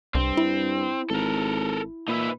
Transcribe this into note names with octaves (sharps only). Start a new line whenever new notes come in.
C2 G2 C4
E4
G#1 A4 A#4
A#2 D#4 B4 E5